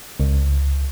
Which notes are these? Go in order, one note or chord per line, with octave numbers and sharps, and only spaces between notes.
C#2